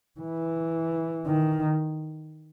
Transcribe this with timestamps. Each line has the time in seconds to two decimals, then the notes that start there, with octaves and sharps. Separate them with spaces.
0.20 E3
1.27 D#3